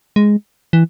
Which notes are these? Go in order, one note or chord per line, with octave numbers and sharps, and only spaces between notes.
G#3
E3